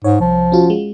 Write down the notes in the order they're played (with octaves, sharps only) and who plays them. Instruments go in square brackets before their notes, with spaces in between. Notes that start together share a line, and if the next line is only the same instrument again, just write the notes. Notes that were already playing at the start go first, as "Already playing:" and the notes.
[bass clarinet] G#2 [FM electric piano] C#5
[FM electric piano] C2 [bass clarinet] F3
[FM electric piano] C#4 F4 F#4
G#3